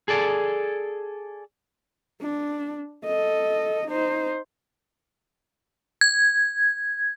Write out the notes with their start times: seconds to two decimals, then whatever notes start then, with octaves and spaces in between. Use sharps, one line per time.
0.08 G#4 A4 D5
2.21 D4
3.05 A4 D#5
3.88 D#4 C5
6.01 G#6